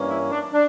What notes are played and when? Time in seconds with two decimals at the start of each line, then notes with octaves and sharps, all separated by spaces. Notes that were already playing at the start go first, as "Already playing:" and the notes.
Already playing: G2 E3 A#3 C#4
0.10 E4
0.31 D4
0.52 D4